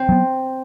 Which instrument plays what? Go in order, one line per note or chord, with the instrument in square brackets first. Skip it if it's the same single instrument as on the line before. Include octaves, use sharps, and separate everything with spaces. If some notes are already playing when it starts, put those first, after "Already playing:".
Already playing: [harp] C4
[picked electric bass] F#3 B3